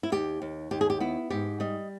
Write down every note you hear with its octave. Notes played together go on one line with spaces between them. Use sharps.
E4
D#2 G4
D#2
D#2 G4
G#4
G4
B3 E4
G#2 G4
G3 D#5